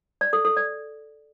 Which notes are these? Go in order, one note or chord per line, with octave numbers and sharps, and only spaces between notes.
D5
A4
A4
D5